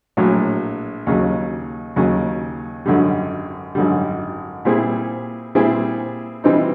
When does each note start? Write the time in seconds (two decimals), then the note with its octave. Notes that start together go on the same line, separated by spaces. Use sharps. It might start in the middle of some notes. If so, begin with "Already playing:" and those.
0.17 A#1 A2 F#3
1.07 D#2 C#3 F#3
1.96 D#2 C#3 F#3
2.86 G#1 F#2 D3 G3
3.75 G#1 F#2 D3 G3
4.65 A#2 G3 C4 E4 G#4
5.55 A#2 G3 C4 E4 G#4
6.44 E3 G3 C4 D#4